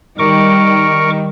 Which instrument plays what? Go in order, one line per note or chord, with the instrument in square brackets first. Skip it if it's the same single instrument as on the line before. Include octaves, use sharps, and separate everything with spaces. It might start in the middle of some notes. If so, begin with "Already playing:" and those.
[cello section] D#3 G3 [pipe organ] A#4 C#6 D6